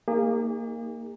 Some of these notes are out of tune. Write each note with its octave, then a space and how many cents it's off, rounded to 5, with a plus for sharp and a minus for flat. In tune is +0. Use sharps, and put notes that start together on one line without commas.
A#3 -10 D#4 +0 G#4 -45